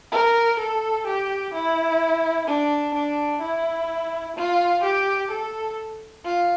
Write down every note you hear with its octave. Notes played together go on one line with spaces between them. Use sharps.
A#4
A4
G4
E4
D4
D4
E4
F4
G4
A4
F4